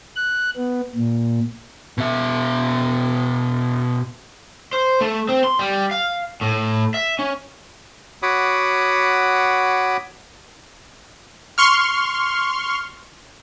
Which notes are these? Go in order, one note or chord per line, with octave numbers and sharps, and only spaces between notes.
F#6
B3
A#2
B2 E5
C5
A3
C4
C6
G3
F5
A2
E5
C#4
F#4 C#5 F#5 B5 D6 D#6
C6 C#6 F6